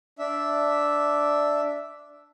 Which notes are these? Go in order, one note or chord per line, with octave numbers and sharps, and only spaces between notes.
D4 E5